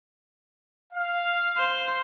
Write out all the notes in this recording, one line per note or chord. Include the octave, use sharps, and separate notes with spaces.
F5
C5